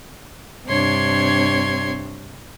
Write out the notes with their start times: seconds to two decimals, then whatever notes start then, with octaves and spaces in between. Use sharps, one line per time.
0.66 G2 C3 D4 C#5 C6 G#6